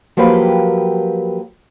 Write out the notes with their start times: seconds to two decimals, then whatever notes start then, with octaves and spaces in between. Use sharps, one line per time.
0.17 F3 F#3 A#3 G4 B4 G5